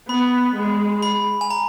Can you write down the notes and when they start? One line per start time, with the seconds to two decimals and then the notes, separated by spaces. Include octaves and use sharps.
0.09 B3 B5
0.56 G#3
1.02 B5
1.41 G#5
1.50 A#5